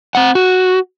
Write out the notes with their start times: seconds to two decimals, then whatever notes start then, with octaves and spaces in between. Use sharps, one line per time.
0.15 C4 F#5
0.35 F#4